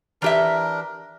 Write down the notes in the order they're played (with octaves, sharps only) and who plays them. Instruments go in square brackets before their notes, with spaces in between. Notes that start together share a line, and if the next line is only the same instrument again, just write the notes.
[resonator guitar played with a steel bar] E3 G4 E5 [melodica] D4 A#4